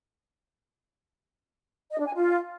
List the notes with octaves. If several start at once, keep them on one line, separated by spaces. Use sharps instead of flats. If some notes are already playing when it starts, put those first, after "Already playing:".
D#5
D4
G#5
F4